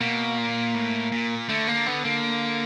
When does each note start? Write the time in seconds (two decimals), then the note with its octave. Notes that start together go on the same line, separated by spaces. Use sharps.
0.01 B2 A#3
0.38 A#2
0.74 A2
1.12 A#2
1.49 D3 A3
1.68 A#3
1.86 B3
2.05 A#3